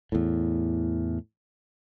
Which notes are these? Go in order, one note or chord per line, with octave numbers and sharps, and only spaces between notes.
E2 A2